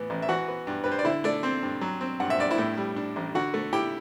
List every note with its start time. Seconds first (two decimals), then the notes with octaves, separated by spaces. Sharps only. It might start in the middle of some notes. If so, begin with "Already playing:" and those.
Already playing: A2 E3 B3
0.10 A1
0.22 E5
0.29 E3 F#4 F#5
0.48 B3
0.67 G2
0.84 G2 B4
0.92 C5
0.99 D5
1.05 D3 E4 E5
1.24 A3 D4 D5
1.43 C4 C5
1.63 G2
1.81 F#3
2.01 C4
2.20 G2 F#5
2.30 E5
2.39 G2 D5
2.51 E4 E5
2.58 A2
2.77 G3
2.96 D4
3.16 A1
3.35 D3 F#4 F#5
3.54 A3
3.73 E4 G4 G5